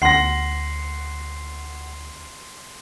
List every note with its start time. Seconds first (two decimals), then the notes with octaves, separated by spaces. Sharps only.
0.02 D2 F#5 C6 A#6 C7